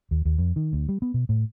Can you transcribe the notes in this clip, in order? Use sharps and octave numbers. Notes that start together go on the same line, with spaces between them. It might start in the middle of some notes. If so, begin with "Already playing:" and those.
D#2
D#2
F2
D#3
D2
G3
B3
B2
A2